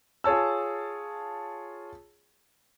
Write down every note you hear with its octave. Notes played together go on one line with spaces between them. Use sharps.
F4 G#4 C#5 A5 E6